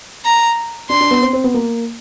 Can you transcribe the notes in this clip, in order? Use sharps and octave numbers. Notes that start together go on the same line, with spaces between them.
A#5
D4 C6
D4
B3
C4
C4
B3
A#3